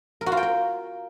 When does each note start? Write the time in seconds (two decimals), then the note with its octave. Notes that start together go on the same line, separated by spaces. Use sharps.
0.21 A#4
0.26 F#4
0.32 F4
0.37 G5
0.43 A#4